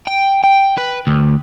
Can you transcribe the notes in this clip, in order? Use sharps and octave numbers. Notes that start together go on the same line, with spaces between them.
G5
G5
B4
D2